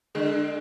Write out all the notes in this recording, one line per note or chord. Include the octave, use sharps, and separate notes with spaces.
D3 G#3